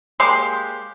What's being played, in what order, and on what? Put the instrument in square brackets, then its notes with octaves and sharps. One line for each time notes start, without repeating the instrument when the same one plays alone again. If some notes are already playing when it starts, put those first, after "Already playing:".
[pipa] G#3 A#3 G4 C6